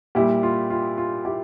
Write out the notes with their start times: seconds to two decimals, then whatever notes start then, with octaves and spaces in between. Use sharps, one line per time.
0.15 A#2 G3 E4 G4
0.43 F4
0.70 F4
0.98 F4
1.25 E4 G4